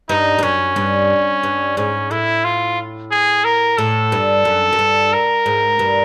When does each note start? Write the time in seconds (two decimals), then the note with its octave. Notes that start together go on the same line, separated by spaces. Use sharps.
0.09 G2 D#4
0.39 G2
0.43 F#2 C#4
0.76 G2
1.43 G2
1.77 G#2 C#4
2.11 A2 E4
2.44 F4
3.11 G#4
3.44 A#4
3.78 A2 A4
4.12 G2
4.45 F#2
4.73 F#2
4.79 G2
5.13 A#4
5.46 G#2
5.79 G2